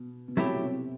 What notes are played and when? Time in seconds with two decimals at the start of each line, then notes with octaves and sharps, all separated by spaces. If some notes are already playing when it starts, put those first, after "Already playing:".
Already playing: B2
0.28 B2
0.36 C3 F#3 A3 E4 G4
0.63 C3